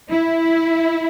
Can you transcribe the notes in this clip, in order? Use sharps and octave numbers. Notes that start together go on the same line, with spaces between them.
E4